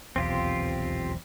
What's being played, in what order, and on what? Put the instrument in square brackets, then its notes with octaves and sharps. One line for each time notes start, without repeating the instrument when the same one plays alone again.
[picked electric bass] D#1 B1 E2 [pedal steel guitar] C4 F4 G4